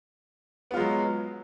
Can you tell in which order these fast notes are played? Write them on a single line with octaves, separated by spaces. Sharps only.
B3 F4 G#3 F#3